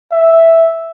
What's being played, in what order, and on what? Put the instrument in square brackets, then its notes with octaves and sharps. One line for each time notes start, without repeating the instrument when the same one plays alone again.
[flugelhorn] E5